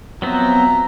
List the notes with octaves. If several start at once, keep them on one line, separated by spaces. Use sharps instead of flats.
F3 F#3 B3 C4 E5 A#5